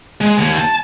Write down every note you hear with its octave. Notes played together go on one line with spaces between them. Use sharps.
G#3
D#2
A5